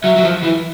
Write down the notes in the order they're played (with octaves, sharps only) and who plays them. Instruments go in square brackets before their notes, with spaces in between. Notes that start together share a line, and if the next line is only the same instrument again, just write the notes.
[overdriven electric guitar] F#3 [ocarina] E5
[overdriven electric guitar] F#3
F3
E3